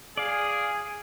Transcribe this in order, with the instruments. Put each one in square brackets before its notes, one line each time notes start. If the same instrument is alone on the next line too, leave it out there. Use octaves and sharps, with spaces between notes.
[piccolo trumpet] G#4 [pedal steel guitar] D5 F5